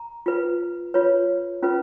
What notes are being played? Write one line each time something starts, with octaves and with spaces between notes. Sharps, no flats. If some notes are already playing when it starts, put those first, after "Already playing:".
Already playing: A#5
F4 B4
F4 B4 C#5
C#4 F4 B4